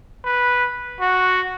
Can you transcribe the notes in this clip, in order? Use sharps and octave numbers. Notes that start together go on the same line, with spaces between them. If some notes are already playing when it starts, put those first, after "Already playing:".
B4
F#4